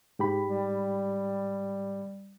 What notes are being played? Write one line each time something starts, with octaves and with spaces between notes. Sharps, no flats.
G#2 G4 B5
G3